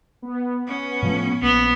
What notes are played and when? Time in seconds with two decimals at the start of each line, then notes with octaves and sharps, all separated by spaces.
0.22 B3
0.67 C#4
1.02 A2 F3 A3
1.42 A#1 B3